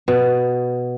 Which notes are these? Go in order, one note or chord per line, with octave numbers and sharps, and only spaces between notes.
B2